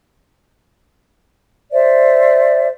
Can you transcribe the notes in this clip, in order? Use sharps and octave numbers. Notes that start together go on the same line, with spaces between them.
C5 D5 E5